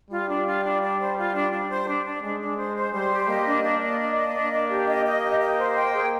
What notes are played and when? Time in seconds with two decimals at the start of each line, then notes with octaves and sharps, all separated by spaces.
0.10 G3 F4
0.29 D4
0.46 F4
0.64 D4
0.81 D4
0.99 C5
1.17 F4
1.34 D4
1.51 D4
1.69 C5
1.87 D4
2.05 D4
2.23 G#3 D4
2.40 D4
2.58 C5
2.76 C5
2.93 G3 C5
3.11 G4
3.28 A#3 D#5
3.46 D4
3.63 A#3 D4
3.81 D#5
3.99 D4
4.16 D#5
4.34 A#3 D4
4.52 D4
4.70 G4
4.88 D#5
5.05 D#5
5.22 G4
5.40 D#5
5.58 C5
5.76 G5
5.93 G#4